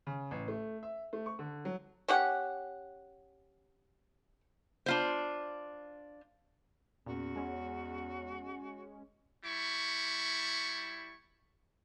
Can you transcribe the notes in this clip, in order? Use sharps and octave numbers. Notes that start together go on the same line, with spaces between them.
C#3
A1
A3
E5
A3
C#6
D3
F#3
C#4 G4 F#5
D4 F4 C5
E2 A#2 C#4 F#4
G#3 C#4 F#5
G3 E4 C#6